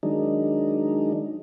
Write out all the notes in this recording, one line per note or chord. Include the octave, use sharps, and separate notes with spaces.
D#3 F#3 G#3 D4 D#4